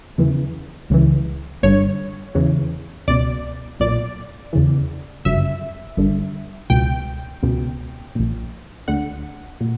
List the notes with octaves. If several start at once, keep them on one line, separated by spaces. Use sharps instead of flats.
E2 C#3 E3
C#2 C#3 E3
G1 G2 D3 C#5
E2 C#3 E3
C#2 B2 D5
B1 A#2 D5
E2 C#3 E3
G1 F#2 C#3 E5
G1 G2 D3
C#2 B2 G5
C#2 B2
A#1 A#2
D2 D3 F#5
A#2